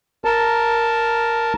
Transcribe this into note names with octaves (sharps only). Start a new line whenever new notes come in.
A#4 A5